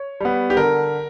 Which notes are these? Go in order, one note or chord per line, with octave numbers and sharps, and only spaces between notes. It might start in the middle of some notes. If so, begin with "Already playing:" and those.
Already playing: C#5
G3 B3
G4
D3 A#4